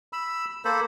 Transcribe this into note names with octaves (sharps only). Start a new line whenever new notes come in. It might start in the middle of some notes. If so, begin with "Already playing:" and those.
B5 E6
A#3 A4 C5 B5